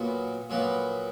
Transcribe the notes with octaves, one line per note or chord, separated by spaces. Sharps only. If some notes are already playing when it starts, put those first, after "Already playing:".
Already playing: A#2 F#3 B3
A#2 F#3 B3